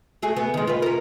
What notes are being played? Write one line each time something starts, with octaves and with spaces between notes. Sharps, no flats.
A3 F#4 G#4
B3
D#3 G#3
F4 B4
C#4 A#4